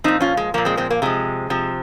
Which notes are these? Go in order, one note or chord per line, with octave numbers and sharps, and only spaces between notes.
A#2 F3 C4 D#4
C#4 F4
G#3
A#2 F3 A#3
G#3 C4
G#3 C4
A#3
C3 F3 G#3
C3 F3